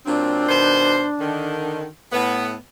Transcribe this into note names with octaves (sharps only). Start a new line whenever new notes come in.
A#2 F#3 C4 D4
B2 D#3 C5
D3 D#3
A2 B3